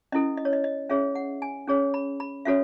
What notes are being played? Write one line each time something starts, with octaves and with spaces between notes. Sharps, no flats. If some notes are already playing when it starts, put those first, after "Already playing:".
C#4 E4 A4 D#5
D#5
C#5
D#5
D#5
C#4 G#4 C#5 E5
F#5
G#5
C#4 G#4 C#5
B5
B5
C#4 F#4 A4 C#5 E5